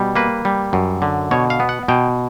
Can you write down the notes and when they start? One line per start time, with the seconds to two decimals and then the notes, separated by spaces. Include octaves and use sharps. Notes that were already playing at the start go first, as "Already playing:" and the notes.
Already playing: B2 G3
0.16 A#3 B4
0.45 G3
0.73 F#2
1.02 D3
1.31 B2 C#5
1.50 F5
1.60 B3
1.69 F#5
1.88 B2 G5